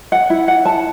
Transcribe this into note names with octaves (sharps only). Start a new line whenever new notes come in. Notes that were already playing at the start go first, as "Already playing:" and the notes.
F#5
E4
F#5
A5